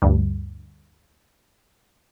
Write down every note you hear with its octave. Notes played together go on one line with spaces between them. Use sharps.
D2 G2